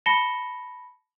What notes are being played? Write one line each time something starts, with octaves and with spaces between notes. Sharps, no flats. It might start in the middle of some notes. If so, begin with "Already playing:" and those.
A5 B5 A#6 C#7 E7 G7